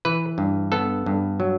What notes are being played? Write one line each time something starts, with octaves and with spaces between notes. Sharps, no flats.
E3 B4
G2
B3 A4
G2
F#3